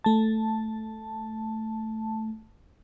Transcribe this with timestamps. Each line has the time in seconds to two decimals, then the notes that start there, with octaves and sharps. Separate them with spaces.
0.04 A3 A5